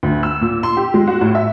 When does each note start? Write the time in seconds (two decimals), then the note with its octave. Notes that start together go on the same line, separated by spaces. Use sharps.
0.03 D2
0.23 E6
0.41 A#2
0.63 C6
0.77 G4
0.94 G#3
1.08 F#4
1.21 A2
1.35 E5